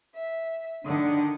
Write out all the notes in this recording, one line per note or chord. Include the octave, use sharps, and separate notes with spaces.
E5
D3 D#3 D4 F#5